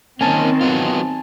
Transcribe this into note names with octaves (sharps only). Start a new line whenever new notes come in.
D#3 A#3 C4 C#4 G#5 A5
F#3 B3 F4